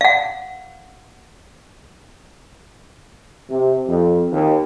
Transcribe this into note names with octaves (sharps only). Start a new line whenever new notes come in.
F5 F#5
C3
F2
D#2